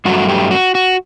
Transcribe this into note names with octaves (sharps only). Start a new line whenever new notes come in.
G2 F#3 A3 F#4
G4
F#4
F#4